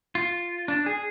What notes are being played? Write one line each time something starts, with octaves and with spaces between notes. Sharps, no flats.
F4
D4
G#4